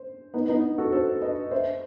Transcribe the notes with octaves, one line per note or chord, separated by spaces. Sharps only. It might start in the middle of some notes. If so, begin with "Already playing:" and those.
Already playing: C5
B3 D#4
B3 D#4
F#4 A4
A4 C5
B4 D#5
C5 E5